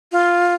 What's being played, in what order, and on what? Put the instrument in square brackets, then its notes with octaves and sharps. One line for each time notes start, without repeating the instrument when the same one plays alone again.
[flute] F4